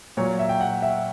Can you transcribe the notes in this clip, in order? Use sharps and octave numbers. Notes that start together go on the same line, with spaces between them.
A#2 F#3 C#5
E5
G5
F#5
E5